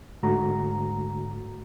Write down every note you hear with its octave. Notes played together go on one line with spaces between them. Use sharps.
G#2 D3 A3 F#4 A#5